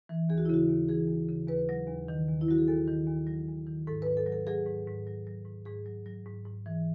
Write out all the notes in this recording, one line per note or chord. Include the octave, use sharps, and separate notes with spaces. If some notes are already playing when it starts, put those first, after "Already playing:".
E3
D#2 G#4
F#4
E4
C#3 F#4
D#2
E3 G#4
D#2
C#3
D#2 B4
F#3
D#2
D#3
D#2
E4
F#3 F#4
G#4
D#2 A4
D#3
D#2
F#3
D#2
D#3
G#2 A4
B4
G#2
A4
F#3
A4
F#3 G#4
G#2
G#2
F#3
F#3
G#2
G#2 G#4
F#3
F#3
G#2
G#2
E3